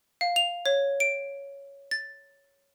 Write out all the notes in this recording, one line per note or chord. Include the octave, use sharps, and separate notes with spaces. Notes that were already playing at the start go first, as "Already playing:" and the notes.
F5
F7
C#5
D7
A6